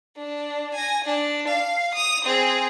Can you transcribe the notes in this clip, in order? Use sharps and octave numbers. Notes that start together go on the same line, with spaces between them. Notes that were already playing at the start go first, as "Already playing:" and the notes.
D4
G#5 A#6
D4
F5
D#6 F7
C4 G#4